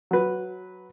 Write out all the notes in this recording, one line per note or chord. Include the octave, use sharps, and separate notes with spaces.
F#3 B4